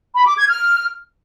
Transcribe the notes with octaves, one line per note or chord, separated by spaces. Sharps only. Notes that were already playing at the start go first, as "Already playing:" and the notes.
B5
D6
G#6
F6